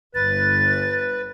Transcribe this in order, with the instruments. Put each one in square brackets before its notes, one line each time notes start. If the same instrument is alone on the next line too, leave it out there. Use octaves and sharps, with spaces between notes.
[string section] G1 [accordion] B4 [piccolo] A6